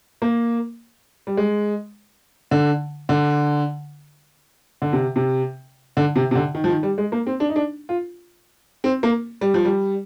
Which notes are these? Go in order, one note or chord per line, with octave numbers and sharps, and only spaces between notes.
A#3
G3
G#3
D3
D3
D3
C3
C3
D3
C3
C3
D3
D#3
F3
D#3
G3
G#3
A#3
C4
D4
D#4
D4
F4
C4
A#3
G3
F3
G3